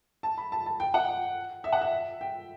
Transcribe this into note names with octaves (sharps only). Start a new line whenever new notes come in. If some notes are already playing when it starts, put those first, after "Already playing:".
A5
B5
A5
A5
G5
F#5
E5
F#5
E5
G5